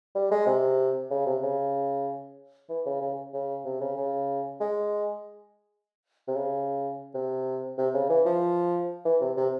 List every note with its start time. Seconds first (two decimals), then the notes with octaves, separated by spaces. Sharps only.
0.15 G3
0.31 G#3
0.46 C3
1.11 C#3
1.26 C3
1.43 C#3
2.69 E3
2.86 C#3
3.01 C#3
3.33 C#3
3.65 C3
3.81 C#3
3.97 C#3
4.60 G#3
6.28 C3
6.35 C#3
7.15 C3
7.78 C3
7.94 C#3
8.10 E3
8.26 F3
9.05 E3
9.21 C3
9.37 C3